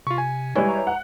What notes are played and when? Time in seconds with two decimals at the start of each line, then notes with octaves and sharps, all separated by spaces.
0.07 C3 F4 C#6
0.18 G#5
0.55 E3 G3 G#3 C#5
0.69 A#5
0.87 F#5